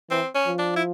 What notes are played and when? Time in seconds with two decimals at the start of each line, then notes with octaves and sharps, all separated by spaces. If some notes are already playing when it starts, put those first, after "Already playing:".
0.10 E3 C4
0.35 C#4
0.47 F3
0.59 D4
0.76 E4